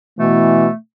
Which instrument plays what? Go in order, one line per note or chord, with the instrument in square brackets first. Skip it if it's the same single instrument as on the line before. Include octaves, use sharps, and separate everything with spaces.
[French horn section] B2 E3 [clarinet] A3